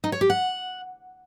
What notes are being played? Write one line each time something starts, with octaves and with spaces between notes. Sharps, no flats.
D#4
C#5
G4
F#5